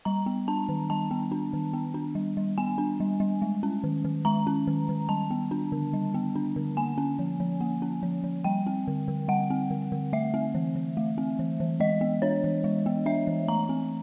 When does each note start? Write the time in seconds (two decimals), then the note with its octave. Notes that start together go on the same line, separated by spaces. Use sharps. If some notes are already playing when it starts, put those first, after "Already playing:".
0.05 G3 A#5
0.26 B3
0.48 D4 A5
0.69 D#3
0.90 G3 A5
1.11 B3
1.32 D4
1.53 D#3
1.73 B3
1.94 D4
2.15 G3
2.37 G3
2.58 B3 G#5
2.78 D4
3.00 G3
3.20 G3
3.42 G#3
3.63 C#4
3.84 D#3
4.05 D#3
4.25 G#3 A#5
4.47 C#4
4.67 D#3
4.89 D#3
5.09 G3 A5
5.31 B3
5.51 D4
5.72 D3
5.93 G3
6.14 B3
6.36 D4
6.56 D3
6.77 A#3 G#5
6.98 C#4
7.19 F3
7.40 F3
7.61 A#3
7.82 C#4
8.03 F3
8.24 F3
8.44 G3 G5
8.67 C4
8.87 D3
9.08 D3
9.28 G3 F#5
9.50 C4
9.70 D3
9.92 D3
10.13 A3 E5
10.34 C4
10.54 E3
10.76 E3
10.97 A3
11.18 C4
11.39 E3
11.60 E3
11.80 G#3 D#5
12.01 B3
12.22 D4 C#5
12.44 E3
12.64 G#3
12.86 B3
13.06 D4 E5
13.27 E3
13.48 A3 A#5
13.69 C4